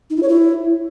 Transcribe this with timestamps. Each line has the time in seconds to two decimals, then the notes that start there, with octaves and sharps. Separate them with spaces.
0.10 D#4
0.16 E4
0.22 C#5
0.29 E4